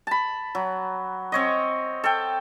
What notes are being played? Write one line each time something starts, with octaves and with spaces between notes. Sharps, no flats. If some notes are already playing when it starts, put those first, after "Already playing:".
A5 B5
F#3
C4 C#5 D#5
A4 G5